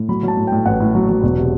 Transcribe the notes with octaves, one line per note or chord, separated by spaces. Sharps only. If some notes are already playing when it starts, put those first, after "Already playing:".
Already playing: A2
F#3 B5
F#3 A5
A2
A2 G5
A1 F#5
A2
F#3
F#3
E1
C3